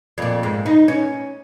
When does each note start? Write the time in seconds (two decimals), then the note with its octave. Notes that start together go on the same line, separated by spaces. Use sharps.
0.18 F2 A#2
0.43 G#2
0.66 D#4
0.88 C#4